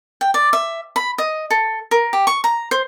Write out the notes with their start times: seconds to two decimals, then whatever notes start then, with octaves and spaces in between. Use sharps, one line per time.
0.21 G5
0.34 D5
0.53 E5
0.96 B5
1.18 D#5
1.51 A4
1.91 A#4
2.13 G4
2.27 C#6
2.44 A#5
2.71 C5